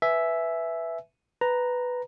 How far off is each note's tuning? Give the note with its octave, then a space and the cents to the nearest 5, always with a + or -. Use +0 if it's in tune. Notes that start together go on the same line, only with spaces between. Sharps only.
B4 +0 E5 +0 G#5 +15
B4 +5 A#5 +0